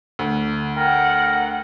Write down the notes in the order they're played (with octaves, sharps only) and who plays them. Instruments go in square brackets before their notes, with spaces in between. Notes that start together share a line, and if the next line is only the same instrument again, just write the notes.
[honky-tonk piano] D2
[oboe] A#4 [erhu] F#5 [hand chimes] G5